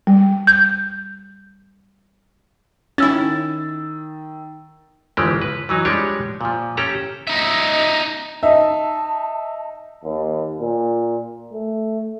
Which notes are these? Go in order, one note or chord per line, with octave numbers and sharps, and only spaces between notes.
G3
G6
D#3 C#4 E4 E6 A6
G1 C#3 E3 F3 G#3 G4
B4
E3 F#3 D#4
F3 G3 G#3 D4 G4 C#5
A#2 F3
C#4 G4 A4 A#5
D#4 E5
D#4 E5 A5
D#2
A#2
A3